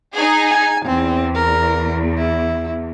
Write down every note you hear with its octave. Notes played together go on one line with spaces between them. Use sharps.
D#4 G#4
G#5
E2 C4
A#4
E4